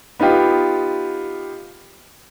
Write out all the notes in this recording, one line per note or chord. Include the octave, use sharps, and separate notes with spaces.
B3 D#4 F4 G4